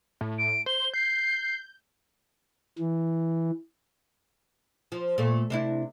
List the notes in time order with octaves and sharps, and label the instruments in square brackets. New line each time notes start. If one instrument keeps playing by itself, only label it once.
[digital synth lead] A2
[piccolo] D7
[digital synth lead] C5 [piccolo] G7
[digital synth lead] G6 [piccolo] C7
[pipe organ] E3
[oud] F3
A#2 A3
C3 D4 E4